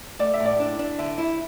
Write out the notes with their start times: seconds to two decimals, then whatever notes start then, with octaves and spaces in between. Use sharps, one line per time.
0.19 A3 D5
0.34 E5
0.40 A2
0.46 D5
0.60 D4
0.79 D4
0.99 D3 E5
1.18 E4